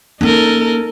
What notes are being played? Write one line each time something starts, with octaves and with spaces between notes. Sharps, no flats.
A#3 C#4 D#4 A4 A#4